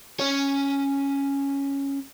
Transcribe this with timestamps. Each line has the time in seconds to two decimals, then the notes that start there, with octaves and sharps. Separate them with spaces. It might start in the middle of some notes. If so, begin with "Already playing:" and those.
0.20 C#4 C#5